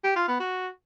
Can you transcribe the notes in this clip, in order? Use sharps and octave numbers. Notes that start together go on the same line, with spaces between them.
G4
F4
B3
F#4